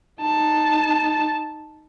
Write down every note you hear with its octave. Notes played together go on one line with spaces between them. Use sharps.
D#4 A5